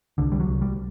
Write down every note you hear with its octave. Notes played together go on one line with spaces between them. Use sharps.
C2 D3
G3
F#3
C2
G3